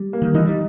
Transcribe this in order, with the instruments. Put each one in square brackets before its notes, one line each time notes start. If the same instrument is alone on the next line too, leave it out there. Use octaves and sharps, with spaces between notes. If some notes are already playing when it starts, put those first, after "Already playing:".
Already playing: [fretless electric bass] G3
[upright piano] A#3
[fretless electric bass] D#3
[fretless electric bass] E3 [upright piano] D#4
[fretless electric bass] G3